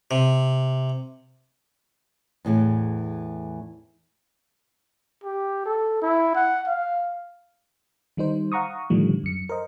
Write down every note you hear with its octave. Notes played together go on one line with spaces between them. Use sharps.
C3
E2 A2 E3 G#4
G4
A4
E4
F#5
F5
D#3 G3 D#4 C5
F5 F#5 A#5 C#6 D#6
A2 D3 D#3 F3 G3 A3
F#2 C#7
A#4 C5 D#5